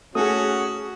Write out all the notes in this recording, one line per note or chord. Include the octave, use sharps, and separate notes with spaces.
A3 C#4 F#4 G#4 D#6